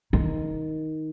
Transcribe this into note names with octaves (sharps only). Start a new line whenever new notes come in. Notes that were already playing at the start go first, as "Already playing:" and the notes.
D#3